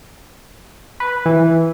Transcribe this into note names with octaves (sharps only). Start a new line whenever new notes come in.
B4
E3